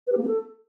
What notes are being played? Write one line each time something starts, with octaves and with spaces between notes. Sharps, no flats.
B4
G4
A#3
B3
A4